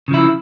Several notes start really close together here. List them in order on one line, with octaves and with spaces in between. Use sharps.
C#3 F3 E4